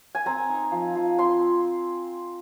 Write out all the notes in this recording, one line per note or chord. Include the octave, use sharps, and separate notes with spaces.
G#5
C4 A#5
D#4
F3
F3
C4 C6